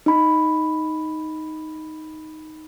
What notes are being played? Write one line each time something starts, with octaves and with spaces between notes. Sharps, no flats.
D#4 B5